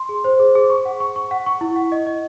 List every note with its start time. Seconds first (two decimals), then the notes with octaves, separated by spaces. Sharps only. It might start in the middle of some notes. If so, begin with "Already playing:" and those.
Already playing: C6
0.09 G#4
0.24 C5
0.39 G#4
0.55 G#4
0.70 C#6
0.85 F#5
1.00 C#6
1.16 C#6
1.31 F#5
1.46 C#6
1.61 E4
1.76 F#5
1.92 D#5
2.07 D#5